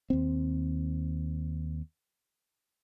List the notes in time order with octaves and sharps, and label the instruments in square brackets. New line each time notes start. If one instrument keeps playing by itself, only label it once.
[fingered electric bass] D#2 C4